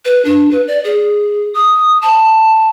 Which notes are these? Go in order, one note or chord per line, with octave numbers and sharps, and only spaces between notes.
B4
D4
B4
D5
G#4
D#6
A5